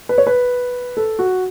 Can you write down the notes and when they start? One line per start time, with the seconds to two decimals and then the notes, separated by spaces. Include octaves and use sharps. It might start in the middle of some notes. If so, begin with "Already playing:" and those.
0.09 B4
0.18 C#5
0.27 B4
0.97 A4
1.19 F#4